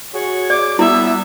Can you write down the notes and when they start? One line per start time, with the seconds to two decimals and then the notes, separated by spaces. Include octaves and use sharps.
0.13 F#4 G#4 C#5
0.50 D5 D6
0.79 G3 B3 E4 E5